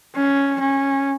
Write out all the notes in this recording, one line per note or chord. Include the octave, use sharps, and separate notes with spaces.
C#4
C#4